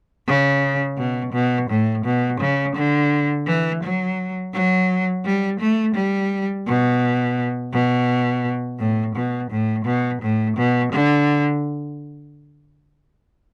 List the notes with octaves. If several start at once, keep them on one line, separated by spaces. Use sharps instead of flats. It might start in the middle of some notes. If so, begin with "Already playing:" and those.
C#3
B2
B2
A2
B2
C#3
D3
E3
F#3
F#3
G3
A3
G3
B2
B2
A2
B2
A2
B2
A2
B2
D3